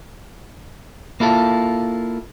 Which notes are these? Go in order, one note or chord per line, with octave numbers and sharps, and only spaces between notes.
A#3 E4 F4 A4